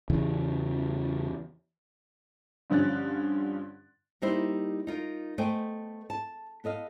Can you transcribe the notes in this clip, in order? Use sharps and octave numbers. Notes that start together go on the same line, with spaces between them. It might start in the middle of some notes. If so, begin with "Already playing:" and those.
E2 C#3 E3
G2 D3 F3 C#4 F#6 A6
G3 A#3 D#4 E4 G4 C5
D#4 F4 A#4
A3 B3 C5 D#5 G5 G#5
A5
B3 A4 D#5 F5